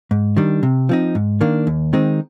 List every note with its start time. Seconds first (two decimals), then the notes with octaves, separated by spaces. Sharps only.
0.11 G#2
0.36 D#3 G3 D4
0.63 C3
0.89 F3 C4 D#4
1.15 G#2
1.41 D#3 A#3 D4
1.67 D#2
1.93 D#3 G#3 C4 D#4